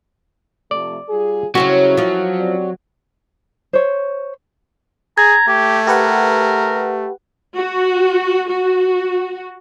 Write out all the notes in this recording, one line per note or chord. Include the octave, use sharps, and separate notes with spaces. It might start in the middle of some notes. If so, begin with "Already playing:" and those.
C3 F3 A3 D5
G3 F4 G#4
F#2 C#3 F#3 G3 C4 C#4 E4 F#4
F3 C#4
C4 G4 D5
C5 C#5
G#4 A#5 G#6
A3 G4
G4 A#4 B4 F#5
F#4
F#4